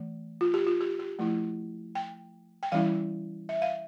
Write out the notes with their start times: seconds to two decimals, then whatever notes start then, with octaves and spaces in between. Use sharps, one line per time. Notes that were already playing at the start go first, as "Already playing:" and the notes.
Already playing: E3 A3
0.41 F4
0.54 G4
0.67 F4
0.81 G4
0.99 G4
1.19 F3 A3 E4
1.95 G5
2.63 G5
2.72 E3 G3 C#4 E4 F5
3.49 E5
3.62 F5